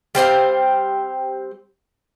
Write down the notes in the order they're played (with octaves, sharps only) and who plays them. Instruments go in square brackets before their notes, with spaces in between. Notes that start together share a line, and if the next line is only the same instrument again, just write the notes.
[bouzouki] G3 C4 C5 F5